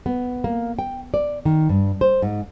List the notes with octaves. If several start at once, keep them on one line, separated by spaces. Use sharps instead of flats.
B3
A#3
G5
D5
D#3
G2
C5
G#2